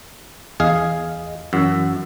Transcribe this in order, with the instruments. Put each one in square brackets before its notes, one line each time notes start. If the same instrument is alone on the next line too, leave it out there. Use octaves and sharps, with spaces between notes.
[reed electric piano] E2 D#5 [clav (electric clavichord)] G#4 F5
[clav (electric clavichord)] F#2 [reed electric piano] E3 F#5 E6